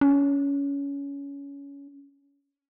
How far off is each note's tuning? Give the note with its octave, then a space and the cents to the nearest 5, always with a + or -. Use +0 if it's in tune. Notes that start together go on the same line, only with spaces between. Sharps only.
C#4 +20